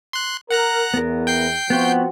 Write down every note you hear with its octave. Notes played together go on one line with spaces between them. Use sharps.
C6 F#6
A#4 F#5 A#5 F#6
E2 B3 A#4
G5 G6 C7
F3 B3 C4 F#4